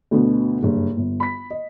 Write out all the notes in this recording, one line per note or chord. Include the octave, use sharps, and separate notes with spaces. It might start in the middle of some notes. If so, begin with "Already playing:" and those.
D2 B2 D3 B3
F#1 G2
G1
B5 B6
D#5